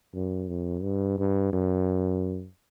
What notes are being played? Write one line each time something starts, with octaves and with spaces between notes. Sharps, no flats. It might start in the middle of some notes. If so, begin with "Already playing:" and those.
F#2
F2
G2
G2
F#2